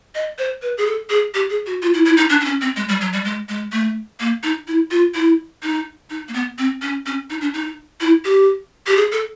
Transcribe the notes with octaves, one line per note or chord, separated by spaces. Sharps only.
D#5
C5
B4
G#4
A4
G#4
G4
G#4
F#4
F4
E4
E4
D#4
D4
D4
C#4
C4
G#3
G3
F#3
G3
G#3
G#3
A3
A#3
D#4
E4
F4
E4
D#4
D#4
A#3
B3
C4
C#4
C#4
D#4
D4
D#4
E4
G4
G4
G#4
A4